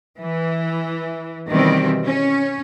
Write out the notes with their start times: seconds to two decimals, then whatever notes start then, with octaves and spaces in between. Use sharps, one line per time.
0.19 E3
1.48 B2 D#3 E3 G3 C4
2.04 C#4